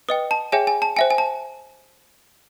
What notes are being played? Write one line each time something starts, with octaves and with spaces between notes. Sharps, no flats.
B4 D#5 G5 D#6
A5
G#4 C#5 E5 G5 G#5
G#5
A5
C5 E5 G5 G#5
G#5
A5